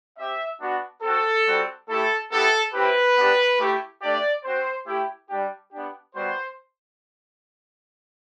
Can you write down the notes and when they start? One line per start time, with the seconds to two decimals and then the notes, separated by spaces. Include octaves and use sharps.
0.18 C4 G4 E5
0.61 B3 D4 F#4
1.03 C4 F#4 A4
1.46 G3 C4 F#4
1.88 A3 E4 G4 A4
2.31 B3 E4 G4 A4
2.73 C4 E4 G4 B4
3.16 B3 D4 G4
3.59 A3 E4 G4
4.01 A3 D4 G4 D5
4.44 C4 F#4 C5
4.87 A3 E4 G4
5.29 G3 D4 G4
5.72 B3 D4 G4
6.15 G3 B3 F#4 C5